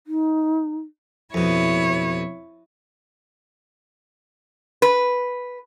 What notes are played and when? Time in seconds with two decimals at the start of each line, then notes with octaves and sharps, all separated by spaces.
0.07 D#4
1.34 F2 B2 E4 C#5
4.82 B4